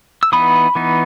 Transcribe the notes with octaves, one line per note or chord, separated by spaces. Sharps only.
E6
E3 B3 D#4 B5 D#6
E3 B3 D#4